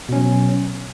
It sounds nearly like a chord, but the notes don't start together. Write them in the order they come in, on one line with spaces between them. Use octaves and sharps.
B2 C#4 F#3